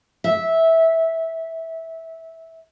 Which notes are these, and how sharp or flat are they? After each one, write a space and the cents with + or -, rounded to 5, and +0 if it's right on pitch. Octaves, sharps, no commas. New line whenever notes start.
E5 -15